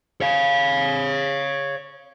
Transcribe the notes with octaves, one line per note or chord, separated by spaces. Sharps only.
C#5 F5